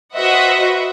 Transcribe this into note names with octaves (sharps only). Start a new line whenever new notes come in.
F#4 B4 C5 D#5 E5 F#5